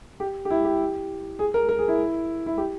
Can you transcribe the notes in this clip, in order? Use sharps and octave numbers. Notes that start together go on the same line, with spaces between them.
G4
G4
E4
G4
G#4
A#4
A#4
G#4
E4
E4
G4